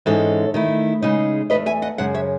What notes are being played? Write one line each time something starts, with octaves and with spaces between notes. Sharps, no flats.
G#2 E3 G#3 C#4 A4 C#5
D#3 A3 E4
C#3 G#3 D#4
E2 B2 A3 B4 D#5
E5 G#5
D#5 F#5
F#2 C#3 G#3 F#5
C#5 E5